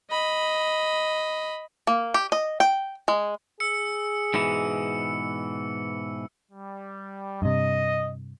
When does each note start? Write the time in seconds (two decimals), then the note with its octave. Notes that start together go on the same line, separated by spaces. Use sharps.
0.10 D#5 B5
1.87 A#3
2.14 G4
2.32 D#5
2.60 G5
3.08 G#3
3.60 G#4 E6 C#7
4.34 G#2 B2 E3 C#7
6.51 G3
7.42 G2 C3 D#5